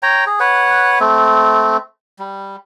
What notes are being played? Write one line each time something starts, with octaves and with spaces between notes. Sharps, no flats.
C#5 G5 A#5
G#4
B4 C#5 F#5
A3 C4
G3